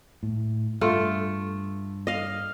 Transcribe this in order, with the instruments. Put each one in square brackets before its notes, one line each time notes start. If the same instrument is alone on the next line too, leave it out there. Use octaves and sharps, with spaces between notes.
[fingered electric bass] A2
[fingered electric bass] G2 [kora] A3 F4
[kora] D#5 F5